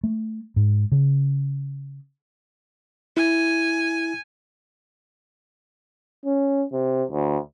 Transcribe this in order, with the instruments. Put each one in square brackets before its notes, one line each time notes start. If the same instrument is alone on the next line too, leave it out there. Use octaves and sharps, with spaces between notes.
[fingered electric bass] A3
G#2
C#3
[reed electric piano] E4 [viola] G#5
[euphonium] C#4
C3
D2